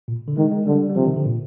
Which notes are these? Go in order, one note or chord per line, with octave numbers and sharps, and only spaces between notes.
A#2
D3
D#3 G#3
G#3
D3 G3
G3
C3 F3
D#3
D3
A#2